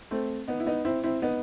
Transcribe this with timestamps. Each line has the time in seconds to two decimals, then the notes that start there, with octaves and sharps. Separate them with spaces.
0.11 A3 C4
0.48 B3 D#4
0.60 E4
0.66 B3 D#4
0.85 C4 E4
1.04 C4 E4
1.22 B3 D#4